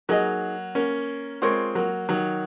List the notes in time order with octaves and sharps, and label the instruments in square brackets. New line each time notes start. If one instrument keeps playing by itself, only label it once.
[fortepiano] F#3 A#3 [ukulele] D#4 G#4 D#5
[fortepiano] A#3 C#4
[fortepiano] G#3 C4 [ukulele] F4 A#4 C#5
[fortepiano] F#3 A#3
D#3 F#3